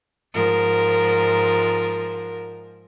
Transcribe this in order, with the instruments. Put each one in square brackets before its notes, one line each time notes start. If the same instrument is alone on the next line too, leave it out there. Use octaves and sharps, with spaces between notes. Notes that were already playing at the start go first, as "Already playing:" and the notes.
[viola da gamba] G#2 F3 A#4